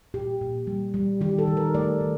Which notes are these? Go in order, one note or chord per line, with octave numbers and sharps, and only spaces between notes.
A#2 G4
A#2
G3
G3
D#3 G4
A4
D#3
A#4
A3 D5
D#3